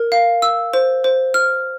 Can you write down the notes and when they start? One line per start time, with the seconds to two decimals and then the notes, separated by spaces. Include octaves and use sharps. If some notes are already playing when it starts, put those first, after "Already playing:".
Already playing: A#4
0.12 F5
0.42 E6
0.73 C5
1.04 C5
1.34 F6